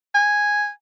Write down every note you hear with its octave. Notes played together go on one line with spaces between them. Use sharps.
G#5